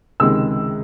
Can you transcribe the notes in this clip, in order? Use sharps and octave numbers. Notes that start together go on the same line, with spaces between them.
C#2 C3 D#3 G#3 E6